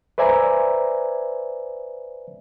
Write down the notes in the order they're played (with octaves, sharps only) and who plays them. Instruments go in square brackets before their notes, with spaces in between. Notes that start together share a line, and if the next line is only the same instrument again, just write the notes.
[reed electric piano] B4 C5 D5 E5 G#5 A#5